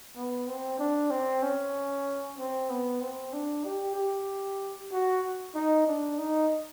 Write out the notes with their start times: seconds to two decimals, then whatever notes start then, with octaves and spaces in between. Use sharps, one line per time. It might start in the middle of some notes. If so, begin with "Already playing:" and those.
0.16 B3
0.48 C4
0.79 D4
1.11 C4
1.43 C#4
2.38 C4
2.70 B3
3.01 C4
3.33 D4
3.64 G4
3.96 G4
4.92 F#4
5.55 D#4
5.87 D4
6.18 D#4